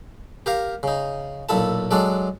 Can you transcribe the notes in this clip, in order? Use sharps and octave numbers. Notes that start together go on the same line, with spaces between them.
G4 A#4 F5
C#3 D#4
B1 A#2 E4 A4 A5
F#3 G#3 D4 A4 D5